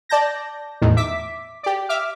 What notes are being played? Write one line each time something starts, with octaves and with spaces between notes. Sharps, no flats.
D5 A5 G6 A#6
E2 A2 D#3
E5 D6 B6
G4 D5
E5 D6 F6